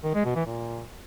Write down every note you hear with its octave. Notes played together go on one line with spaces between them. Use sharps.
D#3
G#3
B2
E3
A#2